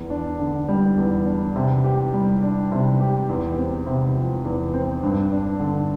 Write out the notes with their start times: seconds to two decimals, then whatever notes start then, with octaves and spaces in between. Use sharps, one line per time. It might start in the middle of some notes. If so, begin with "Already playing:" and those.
Already playing: E2
0.10 D4
0.39 D3
0.68 G3
0.97 E2
1.26 D4
1.56 C3
1.84 G4
2.14 G3
2.43 D4
2.72 C3
3.00 G4
3.29 E2
3.58 C4
3.86 C3
4.16 F3
4.45 E2
4.74 C4
5.03 G2
5.32 D4
5.60 D3